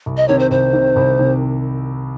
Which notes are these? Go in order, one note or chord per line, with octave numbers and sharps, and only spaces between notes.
C2
D#5
C3 D#3 C#5
C5
C2 C5
C3 D#3
C2
C3 D#3